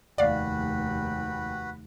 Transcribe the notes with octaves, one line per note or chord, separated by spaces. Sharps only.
F1 D#2 F#4 B4 D5 F5 G5 B5